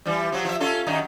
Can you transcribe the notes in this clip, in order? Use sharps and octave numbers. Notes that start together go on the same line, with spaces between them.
E3 G3
F3 F#3
F3 E5
C#4 F4 A4
F#2 D#3 D#4